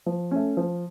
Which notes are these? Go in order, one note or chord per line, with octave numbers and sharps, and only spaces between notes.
F3
A3 C#4
F3